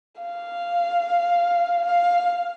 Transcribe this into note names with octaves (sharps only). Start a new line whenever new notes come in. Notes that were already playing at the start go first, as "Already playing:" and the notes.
F5
F5